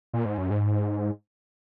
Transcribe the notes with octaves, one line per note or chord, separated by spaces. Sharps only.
A#2
G#2
F#2
G#2